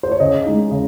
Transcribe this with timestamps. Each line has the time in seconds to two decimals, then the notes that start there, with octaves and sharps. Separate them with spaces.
0.03 C5
0.12 C#5
0.20 C#3 D#5
0.46 G#3 D#4
0.71 C#3